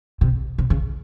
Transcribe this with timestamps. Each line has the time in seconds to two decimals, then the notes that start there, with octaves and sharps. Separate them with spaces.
0.21 C3
0.58 C3
0.70 C#3